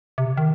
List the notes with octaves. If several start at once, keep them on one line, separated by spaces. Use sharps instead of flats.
C3
D#3